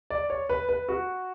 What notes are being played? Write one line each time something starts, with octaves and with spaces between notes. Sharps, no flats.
D5
C#5
B4
B4
F#4